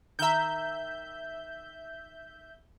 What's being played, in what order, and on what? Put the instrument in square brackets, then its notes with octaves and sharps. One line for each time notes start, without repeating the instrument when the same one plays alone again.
[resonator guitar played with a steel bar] D#3 A#5 [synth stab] E5 G6